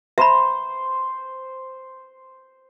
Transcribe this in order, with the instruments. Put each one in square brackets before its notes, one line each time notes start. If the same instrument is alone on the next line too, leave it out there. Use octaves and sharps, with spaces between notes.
[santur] C5 [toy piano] E5 A#5 B5